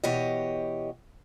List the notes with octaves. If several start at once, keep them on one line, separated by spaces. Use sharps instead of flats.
B2 E3 G4 C#5 D#5